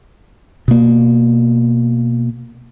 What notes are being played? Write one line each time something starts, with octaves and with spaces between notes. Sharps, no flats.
B2 A#3